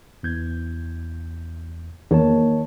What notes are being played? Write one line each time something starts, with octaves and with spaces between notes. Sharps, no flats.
E2 G6 G#6
E2 D#3 A#3 C#5 A5